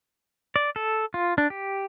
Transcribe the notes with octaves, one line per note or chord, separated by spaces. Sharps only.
D5
A4
F4
D4
G4